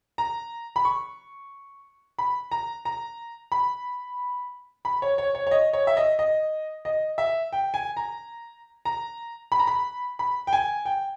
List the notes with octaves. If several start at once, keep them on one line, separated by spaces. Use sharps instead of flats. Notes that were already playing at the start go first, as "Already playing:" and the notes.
A#5
B5
C#6
B5
A#5
A#5
B5
B5
C#5
C#5
C#5
C#5
D#5
C#5
E5
D#5
D#5
D#5
E5
G5
G#5
A#5
A#5
B5
A#5
B5
B5
G5
G#5
G5